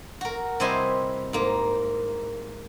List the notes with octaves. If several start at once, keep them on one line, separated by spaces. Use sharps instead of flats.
F#4 A#4
C3 G3 E4 C5 D#5 G#5
G#2 A#3